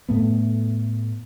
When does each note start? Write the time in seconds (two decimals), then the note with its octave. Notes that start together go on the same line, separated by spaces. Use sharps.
0.09 A2 A3 B3